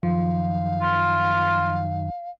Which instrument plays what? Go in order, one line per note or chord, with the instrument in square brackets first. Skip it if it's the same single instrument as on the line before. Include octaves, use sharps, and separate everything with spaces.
[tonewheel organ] F#2 D#3 [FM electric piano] F3 [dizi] F5
[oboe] F4